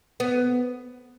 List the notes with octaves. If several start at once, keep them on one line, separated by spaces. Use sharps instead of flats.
B3